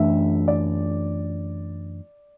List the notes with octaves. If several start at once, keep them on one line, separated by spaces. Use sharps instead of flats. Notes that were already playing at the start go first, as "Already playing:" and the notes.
Already playing: F#2 E3 A3 D4 E5
D5